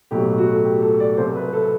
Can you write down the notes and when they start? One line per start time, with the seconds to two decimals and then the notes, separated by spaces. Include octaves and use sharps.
0.11 B1 A2 F#3 G4
0.38 F#4
0.52 A4
0.64 G4
0.82 A4
1.00 D5
1.17 C2 C3 F#3 C5
1.35 B4
1.53 A4